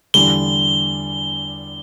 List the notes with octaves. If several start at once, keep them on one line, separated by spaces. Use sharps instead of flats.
E2 D3 G3 G7